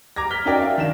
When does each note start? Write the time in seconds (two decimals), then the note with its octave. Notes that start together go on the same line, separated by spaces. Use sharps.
0.16 A#5 D6 G#6 A#6
0.30 F6 B6 G7
0.45 C#4 D#4 F#4 A#4 D5 G5
0.60 E5 F5
0.78 D#3 D4 E7